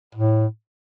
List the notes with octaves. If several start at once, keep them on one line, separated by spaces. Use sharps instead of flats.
A2